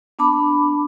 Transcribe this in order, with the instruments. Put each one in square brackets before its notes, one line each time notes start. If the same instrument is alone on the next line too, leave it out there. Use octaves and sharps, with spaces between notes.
[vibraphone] B3 D4 A5 B5 D6